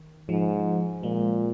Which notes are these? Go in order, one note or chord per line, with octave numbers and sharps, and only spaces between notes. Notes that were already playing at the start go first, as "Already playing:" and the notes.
Already playing: D#3
G#2 F3
A#2 G#3